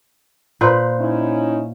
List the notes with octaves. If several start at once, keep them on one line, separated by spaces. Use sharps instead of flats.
A#2 B4 C5
C#4 D#4 E4